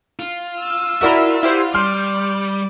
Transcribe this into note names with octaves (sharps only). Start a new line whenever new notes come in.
F4
E6
E4 F#4 A#4 D5 E5 B5
E4 G4 C5
G3 D5 C6 F6 G6